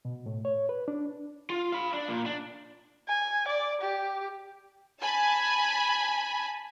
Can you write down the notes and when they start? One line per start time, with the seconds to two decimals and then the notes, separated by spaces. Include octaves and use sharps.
0.05 B2
0.26 A2
0.45 C#5
0.69 B4
0.88 D4
1.50 F4
1.72 F5 B5
1.94 D4
2.08 A#2
2.26 D4
3.09 G#5
3.48 D5
3.82 G4
5.02 G#5 A5 B5